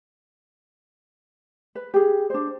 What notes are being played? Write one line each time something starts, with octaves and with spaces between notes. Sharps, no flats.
B4
G4 G#4
D4 C5